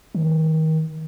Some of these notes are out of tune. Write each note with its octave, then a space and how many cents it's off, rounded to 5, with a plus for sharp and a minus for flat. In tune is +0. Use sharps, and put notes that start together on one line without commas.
D#3 +30